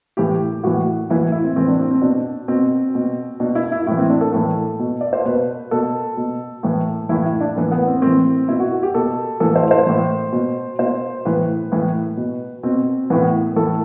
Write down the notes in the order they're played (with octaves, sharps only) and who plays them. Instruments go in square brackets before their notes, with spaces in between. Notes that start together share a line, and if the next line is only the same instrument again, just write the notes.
[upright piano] A2 E3 G4
A2 E3 F#4
A2 E3 E4
E4
C4
A2 E3 C4
D4
C4
C4
B2 D4
B2 C4
B2
B2 D4
E4
E4
A2 E3 E4
C4
D4
A4
A2 E3 A4
B2
D5
C5
B2 B4
B2 A4
B2
A2 E3
A2 E3 E4
E4
D4
A2 E3
B3
C4
A2 E3 C4
B2 E4
F#4
F#4
G4
B2 A4
A2 E3 A4
C5
C5
A2 E3
B2
B2 C5
A2 E3 B4
A2 E3
B2
B2 C4
A2 E3 B3
A2 E3 A4